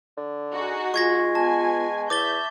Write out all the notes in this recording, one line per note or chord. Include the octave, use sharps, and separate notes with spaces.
D3
D#4 F#4 G#4
G#3 F4 C#6 G#6 A#6
B3 G#5 A5
E2 E5 D6 G6 A6 G7